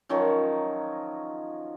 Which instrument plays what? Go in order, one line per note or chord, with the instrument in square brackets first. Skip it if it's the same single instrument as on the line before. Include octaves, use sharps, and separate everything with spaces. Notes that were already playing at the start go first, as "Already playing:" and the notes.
[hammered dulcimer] D#3 F3 F#3 C#4